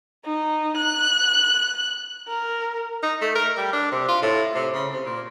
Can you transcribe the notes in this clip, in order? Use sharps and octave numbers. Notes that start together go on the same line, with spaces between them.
D#4
F#6
A#4
D#4
A3
A#4
G3
D4
C3
F4
A2
C3
C#3
C3
A#2